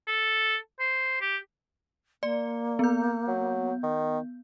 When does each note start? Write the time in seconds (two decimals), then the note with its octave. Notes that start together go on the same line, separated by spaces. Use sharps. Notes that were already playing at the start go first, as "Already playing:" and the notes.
0.07 A4
0.79 C5
1.21 G4
2.23 A#3 D5
2.79 B3 G6
3.28 F#3
3.84 D#3